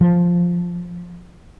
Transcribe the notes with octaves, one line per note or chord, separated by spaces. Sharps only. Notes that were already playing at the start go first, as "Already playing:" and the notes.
F3